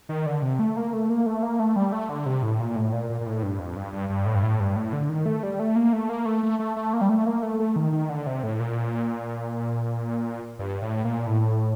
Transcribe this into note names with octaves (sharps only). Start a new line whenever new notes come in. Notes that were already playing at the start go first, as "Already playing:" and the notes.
D#3
D3
C3
A3
A#3
A3
A#3
A3
A#3
A3
G3
A3
D3
C3
A2
A#2
A2
A#2
A#2
A#2
A2
G2
F2
G2
G2
G2
A2
G2
A2
G2
A2
D3
D#3
A3
G3
A3
A#3
A3
A#3
A3
A3
A3
A3
A#3
G3
A3
A#3
A3
A3
D#3
D#3
D3
C3
A2
A#2
G2
A2
A#2
A2